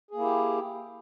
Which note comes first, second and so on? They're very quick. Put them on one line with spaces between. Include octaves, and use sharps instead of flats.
G#4 A#3 E4 G4